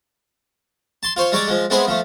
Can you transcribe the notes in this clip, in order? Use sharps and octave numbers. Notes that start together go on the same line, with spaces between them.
A5 C6
F4 C5 C#5
G3 G#3 C#5 D5 A5
F3 G#3
G#3 B3 C4 E4 G#4 C5
F3 A3